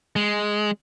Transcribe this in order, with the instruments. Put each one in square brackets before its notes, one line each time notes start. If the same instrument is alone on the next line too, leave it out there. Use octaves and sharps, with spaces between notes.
[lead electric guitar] G#3